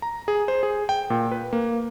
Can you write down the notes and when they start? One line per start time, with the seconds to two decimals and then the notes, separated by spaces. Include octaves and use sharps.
0.02 A#5
0.28 G#4
0.48 C5
0.63 G#4
0.89 G5
1.10 A#2
1.31 B4
1.53 A#3